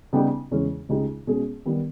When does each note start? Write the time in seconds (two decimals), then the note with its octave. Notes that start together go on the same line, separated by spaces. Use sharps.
0.13 C#3 G3 B3 D#4 G4
0.51 E2 C#3 G#3 C#4
0.89 C#2 C#3 G#3 D#4 G4
1.27 B2 G#3 C#4 G#4
1.65 D#3 G3 B3 G4